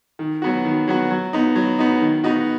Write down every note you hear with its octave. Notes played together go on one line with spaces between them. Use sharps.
D#3
F#3 B3 F#4
D#3
F#3 B3 F#4
F#3
B3 D#4
F#3
B3 D#4
D#3
B3 D#4 F#4